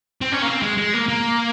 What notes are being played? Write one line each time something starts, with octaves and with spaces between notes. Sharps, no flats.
C4
C#4
A#3
C4
G#3
G#3
A#3
A#3